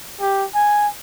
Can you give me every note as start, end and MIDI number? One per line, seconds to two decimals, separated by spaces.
0.21 0.44 67
0.55 0.87 80